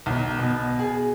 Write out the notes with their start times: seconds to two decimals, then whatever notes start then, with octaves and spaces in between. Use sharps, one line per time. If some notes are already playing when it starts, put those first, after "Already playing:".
0.06 B1
0.38 B2
0.79 G#4